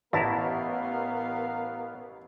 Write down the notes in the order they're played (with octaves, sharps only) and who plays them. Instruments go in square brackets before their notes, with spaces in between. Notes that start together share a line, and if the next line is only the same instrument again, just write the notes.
[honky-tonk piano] A1 [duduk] B3 [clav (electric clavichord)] E4 A5 A#5 [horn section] A#4 F5